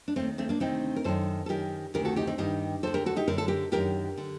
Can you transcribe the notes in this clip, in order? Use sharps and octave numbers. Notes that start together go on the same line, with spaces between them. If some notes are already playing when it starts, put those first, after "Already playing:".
D4
D#2 D#3 A3 C4
A3 C4
A#3 D4
D2 C3 D#3 C4 D#4
A#4
F#2 D#3 A4 C5
A4
F#2 D#3 G4 A#4
D2 C3 D#3 G4 A#4
F#4 A4
D#4 G4
C4 D#4
G2 D#3 D#4 G4
D#2 D3 A4 C5
G4 A#4
F#4 A4
D#4 G4
F#2 D3 A#4
A4
G4 A#4
F#2 D#3 G4 A#4
D3